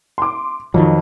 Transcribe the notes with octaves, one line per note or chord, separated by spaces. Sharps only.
C6 D6
F2 D#3 F3 F#3